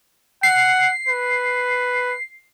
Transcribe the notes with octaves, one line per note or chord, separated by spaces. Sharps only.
F#5 C7
B4